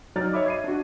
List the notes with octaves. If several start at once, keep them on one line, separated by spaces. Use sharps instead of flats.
F#3 D#4 D5 F6 A6
C#5 D#5 E5 B5 D6
G#6 C7 D#7
D4 F#4